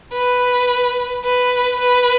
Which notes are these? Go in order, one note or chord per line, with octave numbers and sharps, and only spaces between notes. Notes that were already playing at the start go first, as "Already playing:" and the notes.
B4
B4
B4